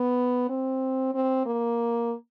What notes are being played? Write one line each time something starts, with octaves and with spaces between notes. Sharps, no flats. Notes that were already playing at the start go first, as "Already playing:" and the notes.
Already playing: B3
C4
C4
A#3